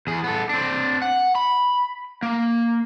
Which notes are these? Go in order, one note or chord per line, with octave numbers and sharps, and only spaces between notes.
E2 G#4
B3 A4
C4 D4
F#5
B5
A#3